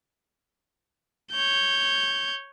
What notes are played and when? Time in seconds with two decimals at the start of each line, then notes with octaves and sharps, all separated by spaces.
1.32 C#5 G6